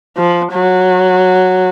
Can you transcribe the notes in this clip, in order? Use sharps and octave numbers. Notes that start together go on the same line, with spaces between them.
F3
F#3